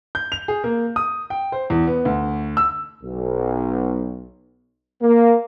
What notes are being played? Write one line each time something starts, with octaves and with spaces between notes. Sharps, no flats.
G6
F7
G#4
A#3
D#6
G5
C5
E2
B3
D2
E6
B1
A#3